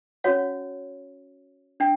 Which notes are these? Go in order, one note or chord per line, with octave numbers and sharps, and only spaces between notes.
C#4 F#4 C#5 F#5
D4 G5